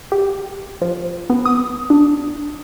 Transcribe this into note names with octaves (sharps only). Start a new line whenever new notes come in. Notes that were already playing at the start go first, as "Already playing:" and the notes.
G4
F3
B3
D#6
D4